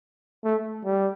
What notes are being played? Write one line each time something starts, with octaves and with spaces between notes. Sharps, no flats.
A3
G3